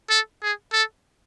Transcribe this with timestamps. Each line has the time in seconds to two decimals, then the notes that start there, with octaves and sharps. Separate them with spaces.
0.10 A4
0.42 G#4
0.73 A4